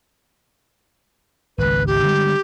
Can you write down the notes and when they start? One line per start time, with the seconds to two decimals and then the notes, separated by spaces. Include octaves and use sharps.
1.58 G#1 C#2 B4
1.87 G4
2.03 D3 G3 G#3